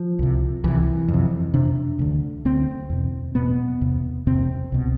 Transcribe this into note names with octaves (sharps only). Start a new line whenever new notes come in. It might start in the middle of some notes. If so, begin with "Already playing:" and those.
Already playing: F3
C2 C3
C2 C3 E3
F2
C3
F2 C3 D4
D2 D3
D2 D3 C4
E2 B2
E2 B2 B3
E2 C3
E2 C3 C4
C2 B2